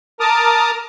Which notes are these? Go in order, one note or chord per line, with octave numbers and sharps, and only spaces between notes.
A#4 A5 D6 D#6 F6